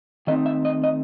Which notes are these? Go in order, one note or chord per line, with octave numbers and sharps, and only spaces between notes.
D#3 A3 C4 D#4 D#5
E5
D#5
D#5